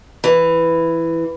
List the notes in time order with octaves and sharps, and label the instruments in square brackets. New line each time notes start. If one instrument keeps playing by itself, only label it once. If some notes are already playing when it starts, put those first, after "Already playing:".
[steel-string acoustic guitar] E3